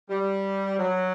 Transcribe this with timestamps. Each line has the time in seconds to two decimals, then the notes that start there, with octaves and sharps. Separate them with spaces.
0.08 G3
0.78 F#3